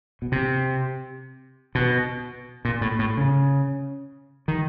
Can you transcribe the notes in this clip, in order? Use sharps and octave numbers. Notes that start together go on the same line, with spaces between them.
B2
C3
B2
A#2
A2
A2
C#3
D#3